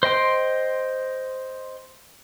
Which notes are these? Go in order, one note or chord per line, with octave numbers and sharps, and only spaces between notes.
C5 D#5 G5 C6